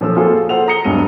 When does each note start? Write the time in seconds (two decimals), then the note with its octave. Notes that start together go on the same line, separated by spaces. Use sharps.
0.01 A#2 F3 C#4 A4 E6
0.16 A#3 F4 F#4 G#4 A4 C5
0.49 A4 C5 F#5 F7
0.68 A#5 D#6 A#6 C#7 G7
0.84 D#1 G2 F#3 G#3 B3 D#7